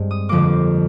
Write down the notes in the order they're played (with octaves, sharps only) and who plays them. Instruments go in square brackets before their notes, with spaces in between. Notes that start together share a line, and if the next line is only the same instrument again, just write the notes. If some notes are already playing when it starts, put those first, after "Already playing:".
Already playing: [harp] G2 G#3 C4
D#6
F2 D3 F3 A#3 D6